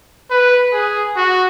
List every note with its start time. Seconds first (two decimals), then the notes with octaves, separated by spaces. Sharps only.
0.30 B4
0.73 G#4
1.17 F#4